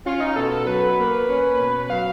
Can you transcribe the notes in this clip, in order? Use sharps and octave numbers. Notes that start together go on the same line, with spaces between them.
C#4 F4
D#4
B2 A4
A4
F#3 B4
A#3
C#4
B2
F#3 F5